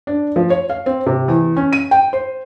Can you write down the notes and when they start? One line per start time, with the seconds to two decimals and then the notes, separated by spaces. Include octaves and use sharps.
0.07 D4
0.36 F3
0.50 C#5
0.70 F5
0.86 C4
1.06 C3
1.28 E2
1.57 C#4
1.73 D#7
1.91 G5
2.13 C5